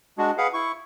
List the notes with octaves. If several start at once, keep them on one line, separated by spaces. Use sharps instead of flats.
G#3 D4 F#4
G#4 B4 F5 F#5
E4 C#6